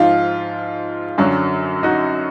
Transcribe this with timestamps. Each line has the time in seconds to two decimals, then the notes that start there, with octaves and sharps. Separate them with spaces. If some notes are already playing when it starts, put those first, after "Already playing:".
Already playing: G#2 F3 F4
1.18 F#2 D3 F#3
1.83 D#4 F#4